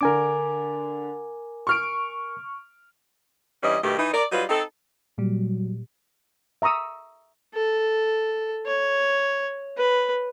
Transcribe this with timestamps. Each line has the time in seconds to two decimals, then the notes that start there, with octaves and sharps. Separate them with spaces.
0.01 D3 D4 A#4 G#5 D6
1.67 C#6 F6 D7
3.63 G2 E3 G3 C#4 D#5
3.83 G2 B2 D#3 A3 G4
3.98 E3 D#4
4.14 A#4 D5
4.32 F#3 G3 D#4 F4 B4
4.50 C4 D#4 A4
5.18 A#2 F#3 G3
6.62 E5 A#5 C#6 D#6 E6
7.54 A4
8.66 C#5
9.77 B4